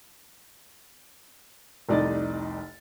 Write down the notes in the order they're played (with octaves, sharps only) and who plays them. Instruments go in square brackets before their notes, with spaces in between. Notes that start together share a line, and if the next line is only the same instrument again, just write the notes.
[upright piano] F1 C2 D#4 D5 D#5 A6